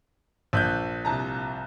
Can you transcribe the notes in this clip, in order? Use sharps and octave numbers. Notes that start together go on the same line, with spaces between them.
A#1 E6 F#6 G6
C2 A5 A#5